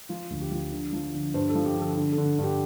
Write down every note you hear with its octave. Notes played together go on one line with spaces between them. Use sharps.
F3 F4
D2
G4
F3
D3
F3
D3
G2 C5
A4
F3
G4
D3 A4
D3
A4
D3
G2
G4